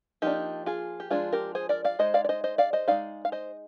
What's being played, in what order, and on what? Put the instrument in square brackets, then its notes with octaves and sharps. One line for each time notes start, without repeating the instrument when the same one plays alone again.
[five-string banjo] F3 A#3 D4 D#4 G4
F4 G#4
G4
F3 G#3 D4 F4 G#4
G4 A#4
G#4 C5
A#4 D5
D5 F5
G#3 D#4 C5 D#5
D5 F5
D5
C5 D#5
C5 D#5
D5 F5
C5 D#5
G#3 D#4 D5 F5
F5
C5 D#5